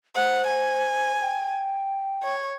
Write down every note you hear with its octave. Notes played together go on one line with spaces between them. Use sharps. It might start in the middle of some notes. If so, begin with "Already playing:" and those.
C5 F#5
G#5
G5
C#5